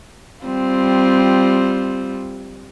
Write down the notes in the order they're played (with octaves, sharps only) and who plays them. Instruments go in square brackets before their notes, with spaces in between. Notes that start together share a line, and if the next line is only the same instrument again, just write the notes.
[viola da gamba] G3 C4 F4